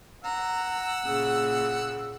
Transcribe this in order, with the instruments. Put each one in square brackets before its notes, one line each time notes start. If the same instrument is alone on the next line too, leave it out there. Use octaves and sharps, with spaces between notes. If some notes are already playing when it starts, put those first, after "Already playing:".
[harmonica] F#5 E6 [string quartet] A#5
[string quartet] A#2 C#3